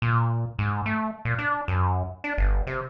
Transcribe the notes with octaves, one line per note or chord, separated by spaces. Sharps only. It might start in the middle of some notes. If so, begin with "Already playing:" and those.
A#2
G#2
A3
A#2
D4
F#2
D4
G1
C3